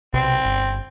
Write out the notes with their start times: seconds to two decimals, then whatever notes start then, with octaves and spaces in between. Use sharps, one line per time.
0.14 B1 C3 C4
0.44 G1